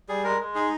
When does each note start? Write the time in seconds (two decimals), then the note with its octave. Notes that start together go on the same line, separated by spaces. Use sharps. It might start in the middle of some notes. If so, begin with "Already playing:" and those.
0.09 G3 G#4
0.24 G#3 A#4
0.40 G#3
0.55 D#4 G#4